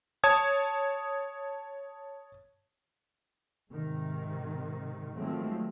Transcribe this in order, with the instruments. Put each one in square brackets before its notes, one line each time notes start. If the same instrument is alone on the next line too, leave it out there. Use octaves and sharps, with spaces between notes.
[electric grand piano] C#5 A5 D#6 G#6
[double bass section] G#2 C3 D#3
D#3 F3 F#3 G#3 A3 C4